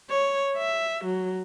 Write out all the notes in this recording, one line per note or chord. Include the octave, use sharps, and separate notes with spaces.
C#5
E5
F#3